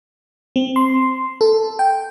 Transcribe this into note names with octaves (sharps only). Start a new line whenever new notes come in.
C4
C6
A4
G5